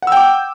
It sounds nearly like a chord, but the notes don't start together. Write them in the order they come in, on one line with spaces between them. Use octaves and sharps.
F#5 E6 G5 D6